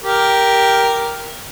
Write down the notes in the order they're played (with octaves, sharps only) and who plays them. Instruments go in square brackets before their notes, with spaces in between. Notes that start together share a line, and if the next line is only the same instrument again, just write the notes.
[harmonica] G4 A#4